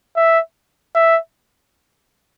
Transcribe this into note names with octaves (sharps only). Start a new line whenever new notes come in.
E5
E5